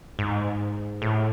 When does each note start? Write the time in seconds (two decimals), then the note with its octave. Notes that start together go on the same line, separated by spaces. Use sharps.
0.19 G#2
1.02 A2